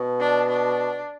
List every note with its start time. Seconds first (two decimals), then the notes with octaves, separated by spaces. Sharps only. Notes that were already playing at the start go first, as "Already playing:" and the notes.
Already playing: B2
0.20 D4
0.49 D4